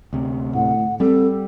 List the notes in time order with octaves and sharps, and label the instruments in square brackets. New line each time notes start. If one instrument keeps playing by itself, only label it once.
[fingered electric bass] D2 C3
[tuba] A2 [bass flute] F#5
[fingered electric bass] G3 [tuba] C4 [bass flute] A4